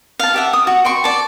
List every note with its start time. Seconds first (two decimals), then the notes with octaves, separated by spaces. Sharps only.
0.20 F5 A5
0.34 G4 E5 F#5
0.53 D#6
0.67 F#4
0.85 G5 C6 C#6
1.04 D5 A5